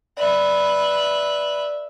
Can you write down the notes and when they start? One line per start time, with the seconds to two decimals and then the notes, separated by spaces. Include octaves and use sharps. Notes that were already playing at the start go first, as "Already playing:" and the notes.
0.17 B4 D5 E5